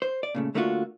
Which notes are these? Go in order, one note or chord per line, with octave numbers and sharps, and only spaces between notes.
C5
D5
A#2 C#3 A3
D3 A3 A#3 D4 F4 F#4